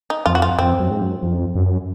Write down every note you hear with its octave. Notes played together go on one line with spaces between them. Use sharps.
D#4
F2 F4
F#4
F4
F2 C4
F#2
G#2
F#2
F2
F#2